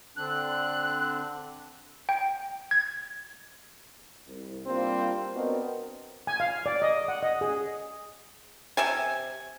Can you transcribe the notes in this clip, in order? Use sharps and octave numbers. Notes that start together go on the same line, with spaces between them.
D3 C4 D4 F#6
G5
G#6
C2
G3 A#3 C4 D4 F4 C5
B3 C4 D4 F#4 A#4 D#5
G#5
F5
D5
D#5
F#5
D#5
G#4
C3 E5 G#5